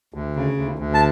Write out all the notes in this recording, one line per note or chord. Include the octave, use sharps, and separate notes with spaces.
D2
C#3
D2
D2
A5